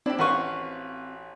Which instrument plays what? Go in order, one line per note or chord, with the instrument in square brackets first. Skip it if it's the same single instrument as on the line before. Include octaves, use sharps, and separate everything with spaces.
[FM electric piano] C4 [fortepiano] D4 [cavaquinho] E4 G4
[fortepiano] A1 B4 [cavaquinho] F#4 F5 C#6